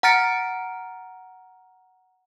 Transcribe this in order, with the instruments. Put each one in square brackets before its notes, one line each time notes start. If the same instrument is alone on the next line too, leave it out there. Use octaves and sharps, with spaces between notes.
[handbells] F#5 A#5 F6 A6 C#7 D7